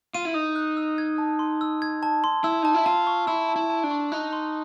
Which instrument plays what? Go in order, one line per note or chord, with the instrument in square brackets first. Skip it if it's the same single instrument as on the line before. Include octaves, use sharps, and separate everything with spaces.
[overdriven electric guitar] F4 [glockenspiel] D#7
[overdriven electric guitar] E4
[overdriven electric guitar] D#4 [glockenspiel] D#6
[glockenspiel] F#6
E6
G#6
A5
C6
E6
G#6
A5
C6
[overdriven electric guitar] E4 [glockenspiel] E6
[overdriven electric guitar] D#4 [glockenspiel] A5
[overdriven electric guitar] E4
[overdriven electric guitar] F4 [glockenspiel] A5
[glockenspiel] C#6
[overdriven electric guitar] E4 [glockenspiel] E6
[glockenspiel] A5
[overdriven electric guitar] E4
[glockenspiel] A5
[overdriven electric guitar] D4
[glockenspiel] C#6
[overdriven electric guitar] D#4 [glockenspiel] F#6
[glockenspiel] C6